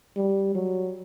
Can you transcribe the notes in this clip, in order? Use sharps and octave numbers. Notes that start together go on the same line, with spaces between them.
G3
F#3